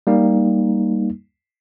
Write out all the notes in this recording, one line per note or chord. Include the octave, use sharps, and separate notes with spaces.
G3 A#3 D#4